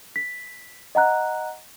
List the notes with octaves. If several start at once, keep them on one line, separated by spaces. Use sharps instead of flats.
B6
D#5 F#5 A#5 F#6